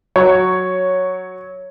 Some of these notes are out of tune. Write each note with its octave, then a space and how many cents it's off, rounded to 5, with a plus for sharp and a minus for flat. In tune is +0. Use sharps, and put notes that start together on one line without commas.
F#3 +0 C#5 +0